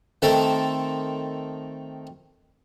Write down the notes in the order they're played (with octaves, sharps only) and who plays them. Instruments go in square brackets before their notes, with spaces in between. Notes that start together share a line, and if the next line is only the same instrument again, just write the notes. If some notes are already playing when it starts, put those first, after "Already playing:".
[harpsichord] D#3 A3 C4 A4